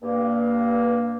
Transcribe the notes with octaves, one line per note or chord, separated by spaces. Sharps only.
G2 A#3